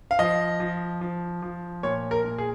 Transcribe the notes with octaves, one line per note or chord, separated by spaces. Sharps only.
F5
F3 D#5
F3
F3
F3
A#2 C#5
A#4
A#2
G#4